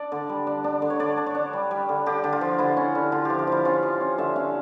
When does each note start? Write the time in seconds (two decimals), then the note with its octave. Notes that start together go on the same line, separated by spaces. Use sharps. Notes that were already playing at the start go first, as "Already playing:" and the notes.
Already playing: D4 D5
0.12 D3
0.29 G3
0.47 D4
0.64 D4
0.82 D3
0.90 C#5
0.99 D3 D5
1.17 D4
1.26 C#5
1.35 D4
1.53 G3
1.71 G3
1.89 D3
2.06 D3 G4
2.24 D3
2.32 F4
2.41 F3
2.58 D3 E4
2.77 C#4
2.95 D3
3.12 D3 F4
3.25 F3 G4
3.39 F4
3.47 F3 E4
3.65 C#4 F4
3.83 F3
4.01 C#4
4.18 D3 E5
4.36 C#4 F5